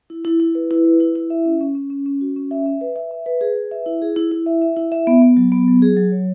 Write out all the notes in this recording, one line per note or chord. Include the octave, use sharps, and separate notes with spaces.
E4
E4
E4
B4
E4
B4
E4
E4
E5
C#4
C#4
C#4
C#4
C#4
F#4
C#4
E5
E5
B4
E5
E5
B4
G#4
B4
E5
E4
G#4
E4
E4
E5
E5
E4
E5
B3
B3
F#3
B3
F#3
G#4
F#3
C#5